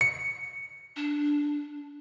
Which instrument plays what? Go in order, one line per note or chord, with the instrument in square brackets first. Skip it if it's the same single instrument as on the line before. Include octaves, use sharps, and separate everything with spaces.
[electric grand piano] C#7
[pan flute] D4